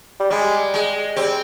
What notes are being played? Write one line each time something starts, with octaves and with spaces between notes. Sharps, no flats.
G3
G3 G#3
G#3
G3 C4